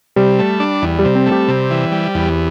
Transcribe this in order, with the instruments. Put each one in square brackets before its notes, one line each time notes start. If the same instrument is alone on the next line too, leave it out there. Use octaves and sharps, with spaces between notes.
[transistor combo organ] C3 [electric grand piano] G3
[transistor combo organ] A3
D4
E2
[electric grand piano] G3
[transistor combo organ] C3
[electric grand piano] C4
[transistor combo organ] A3
[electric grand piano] G4
[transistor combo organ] C3
E3
G3
E2